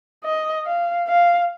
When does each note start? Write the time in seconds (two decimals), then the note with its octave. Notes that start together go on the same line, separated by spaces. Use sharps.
0.24 D#5
0.66 F5
1.08 F5